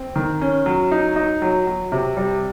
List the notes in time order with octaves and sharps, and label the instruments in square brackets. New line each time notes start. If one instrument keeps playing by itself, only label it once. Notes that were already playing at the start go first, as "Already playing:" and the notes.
Already playing: [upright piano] C4
D#3
C#4
F#3
D#4
D#4
F#3
F#3
C3
G3